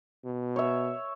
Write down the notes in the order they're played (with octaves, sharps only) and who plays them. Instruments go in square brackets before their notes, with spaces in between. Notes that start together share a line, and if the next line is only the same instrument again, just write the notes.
[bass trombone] B2
[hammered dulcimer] C#5 E5